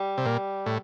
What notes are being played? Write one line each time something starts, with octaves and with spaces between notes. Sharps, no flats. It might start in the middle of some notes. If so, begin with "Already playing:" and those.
Already playing: G3
C3
A#2
A2